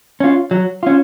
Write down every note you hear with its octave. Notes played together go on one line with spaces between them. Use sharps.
C#4 F4
F#3
C#4 F4